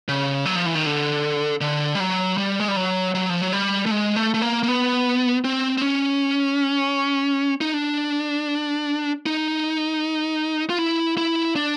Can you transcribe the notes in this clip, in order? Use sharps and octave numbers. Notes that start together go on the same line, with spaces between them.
C#3
F#3
F3
E3
D#3
D3
D3
G3
F#3
G3
G#3
G3
F#3
F#3
F3
F#3
G3
A3
G#3
A3
A3
A#3
A#3
B3
C4
C4
C#4
D#4
D4
D#4
F4
E4
E4
D4